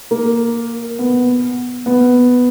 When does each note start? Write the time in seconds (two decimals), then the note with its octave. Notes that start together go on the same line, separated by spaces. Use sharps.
0.11 A#3
0.99 B3
1.86 B3